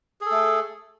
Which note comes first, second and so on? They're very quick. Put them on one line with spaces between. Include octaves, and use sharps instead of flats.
G#4 A4 A3